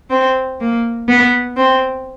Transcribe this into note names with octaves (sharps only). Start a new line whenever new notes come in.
C4
A#3
B3
C4